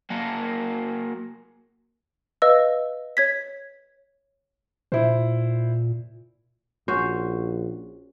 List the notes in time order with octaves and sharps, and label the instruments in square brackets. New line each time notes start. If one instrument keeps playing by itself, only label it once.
[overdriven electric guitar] F#3 A#3
[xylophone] B4 D#5 F5 E6
C#5 G#6 B6
[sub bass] A#2 [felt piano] E4 C5
[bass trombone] A#1 [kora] C#4 F#4 C5